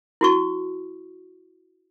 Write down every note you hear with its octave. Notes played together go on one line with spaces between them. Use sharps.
E4 F#4 C#6